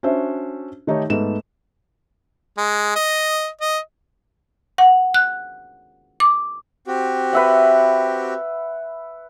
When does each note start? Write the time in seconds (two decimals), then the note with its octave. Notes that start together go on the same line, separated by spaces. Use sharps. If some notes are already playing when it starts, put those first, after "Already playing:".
0.03 C#4 D4 F#4 C5 E5
0.87 D#3 A3 D#4 G4 A4 C#5
1.10 G#2 A3 B3 E7
2.58 G#3
2.96 D#5
3.61 D#5
4.78 F#5
5.14 F#6
6.20 D6
6.87 C4 F#4 G4
7.33 B4 E5 F#5